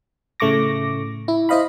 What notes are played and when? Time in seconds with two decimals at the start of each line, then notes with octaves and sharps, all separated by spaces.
0.40 A2 C#3 A3 C#6 D6 A#6
1.28 E4
1.49 E4 C5 D#5 F5 B5